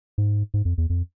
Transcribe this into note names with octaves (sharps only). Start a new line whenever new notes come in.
G#2
G#2
F2
E2
F2